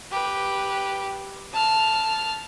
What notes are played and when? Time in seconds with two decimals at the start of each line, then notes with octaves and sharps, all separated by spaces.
0.12 G4 B4
1.53 A5 F6